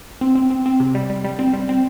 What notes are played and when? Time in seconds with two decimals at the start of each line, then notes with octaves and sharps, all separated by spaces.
0.21 C4
0.35 C4
0.50 C4
0.66 C4
0.80 C3
0.95 G3
1.10 G3
1.24 G3
1.39 C4
1.53 G3
1.69 C4